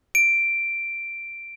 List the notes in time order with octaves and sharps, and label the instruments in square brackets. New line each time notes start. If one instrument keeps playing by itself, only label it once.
[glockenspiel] D7